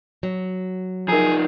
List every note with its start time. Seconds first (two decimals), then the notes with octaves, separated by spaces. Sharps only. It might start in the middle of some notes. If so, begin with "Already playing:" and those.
0.23 F#3
1.08 F3 D#4 G#4 A#4 F5 A#5